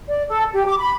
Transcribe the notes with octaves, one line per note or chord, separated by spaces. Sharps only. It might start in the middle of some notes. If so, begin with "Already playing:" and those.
D5
A4
G4
D6
B5